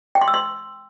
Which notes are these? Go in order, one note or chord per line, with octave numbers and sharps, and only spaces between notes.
G5
C6
E6
C6